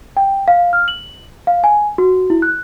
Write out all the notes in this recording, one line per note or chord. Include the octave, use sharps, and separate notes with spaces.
G5
F5
F6
F#7
F5
G#5
F#4
E4
F#6